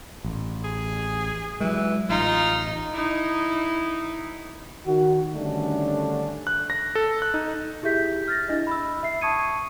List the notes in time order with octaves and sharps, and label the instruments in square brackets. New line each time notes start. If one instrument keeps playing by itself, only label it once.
[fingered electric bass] A1
[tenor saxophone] G#4
[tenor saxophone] E3 [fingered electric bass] F#3 G#3
[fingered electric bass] A1 [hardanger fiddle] D#4 [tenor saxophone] F4
[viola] D#4 E4
[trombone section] D#3 F#4
D3 D#3 G3 A3 C#4 D4
[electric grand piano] F#6
A#6
A4
F#6
D#4
[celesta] E4 G4 G#4 E5 G6 B6
F6 A6 A#6
D4 E4 D#5
B5 E6
E5 C7
A5 C#6 D#6 G#6 C#7 D#7